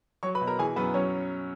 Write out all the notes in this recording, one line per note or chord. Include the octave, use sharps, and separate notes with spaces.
F#3 C#5 C#6
B4 B5
B2
A#4 A#5
E3 G#4 G#5
F#2 B3 B4
F#3 C#4 C#5